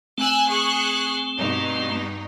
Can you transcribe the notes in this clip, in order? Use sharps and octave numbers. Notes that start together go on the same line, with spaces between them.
A3 C4 G#5 E6 F#6
G#4 C#6 F#6
G2 B2 D#4